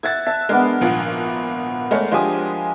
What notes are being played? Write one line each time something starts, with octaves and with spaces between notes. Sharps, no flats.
E5 F#5 G#6 A6
E5 A5
G#3 B3 D4 A#4
G#1 A#2 F3
G#3 A3 A#4 C#5
F3 G#3 D4 G4 G#5 D#6